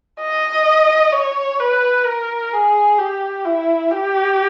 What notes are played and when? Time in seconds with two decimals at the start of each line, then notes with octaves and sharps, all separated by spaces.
0.21 D#5
1.12 C#5
1.60 B4
2.06 A#4
2.53 G#4
2.98 G4
3.45 E4
3.92 G4